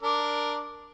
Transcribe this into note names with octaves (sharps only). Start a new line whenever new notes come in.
D4 A#4 D6